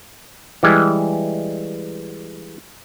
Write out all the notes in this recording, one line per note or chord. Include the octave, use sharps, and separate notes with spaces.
E3 G3 G#3